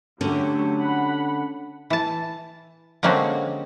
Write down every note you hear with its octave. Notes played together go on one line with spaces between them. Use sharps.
D3 F#3 A3 C#4 G4
F#5 B5
E3 A5
D3 G#3 A#3 C4 C#4 F#4